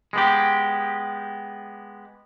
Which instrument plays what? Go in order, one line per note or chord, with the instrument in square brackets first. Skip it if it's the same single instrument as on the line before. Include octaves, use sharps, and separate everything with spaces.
[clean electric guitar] G#3 B3 G4